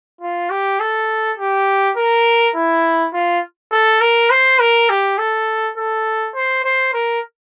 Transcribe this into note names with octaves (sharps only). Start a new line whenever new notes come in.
F4
G4
A4
G4
A#4
E4
F4
A4
A#4
C5
A#4
G4
A4
A4
C5
C5
A#4